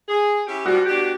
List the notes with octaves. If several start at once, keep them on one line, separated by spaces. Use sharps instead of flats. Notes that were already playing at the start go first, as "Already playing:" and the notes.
G#4
C#4 E4 G4
F3 G3 F#4
B2 D4 G4